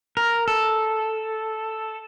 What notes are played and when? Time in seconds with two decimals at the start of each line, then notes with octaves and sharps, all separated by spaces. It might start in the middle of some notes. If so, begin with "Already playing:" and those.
0.17 A#4
0.48 A4